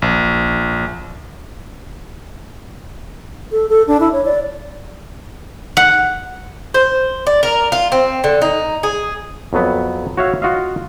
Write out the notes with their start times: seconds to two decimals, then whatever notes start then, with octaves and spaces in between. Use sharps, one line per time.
0.02 A#1
3.52 A4
3.69 A4
3.87 D4
4.00 E4
4.13 C#5
4.25 D5
5.77 F#5
6.74 C5
7.27 D5
7.43 A#4
7.72 F4
7.92 C4
8.24 D3
8.42 D#4
8.83 G#4
9.53 F2 F#3 B3
10.17 F#4 C#5 E5 F5
10.42 F4 F#4 D#5 F5